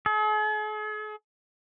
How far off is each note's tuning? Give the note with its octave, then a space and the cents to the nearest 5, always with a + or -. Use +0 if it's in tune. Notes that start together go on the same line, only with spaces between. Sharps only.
G#4 +45